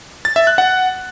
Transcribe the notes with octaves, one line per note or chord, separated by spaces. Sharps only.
A6
E5
F#6
F#5